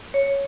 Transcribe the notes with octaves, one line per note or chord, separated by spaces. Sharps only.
C#5